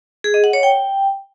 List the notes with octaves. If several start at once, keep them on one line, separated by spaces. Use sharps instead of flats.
G#4
D#5
F#5
C#5
G5